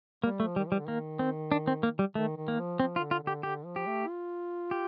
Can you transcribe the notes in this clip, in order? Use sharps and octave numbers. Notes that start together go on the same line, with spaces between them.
G3 A#3
A3
F3
D#3 G3
F3 G3
D3
D#3 A#3
C4
D4
C4
A#3
G3
D#3 A3
D#3
A#3
F3
F3 C4
F4
D3
F4
D3 G4
D3 G4
F3
G4
A3
F4
G4